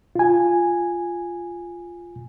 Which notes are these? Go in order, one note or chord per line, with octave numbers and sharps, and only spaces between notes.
F4 G#5